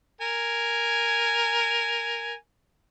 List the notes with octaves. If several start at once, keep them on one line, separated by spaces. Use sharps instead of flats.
A#4 G#5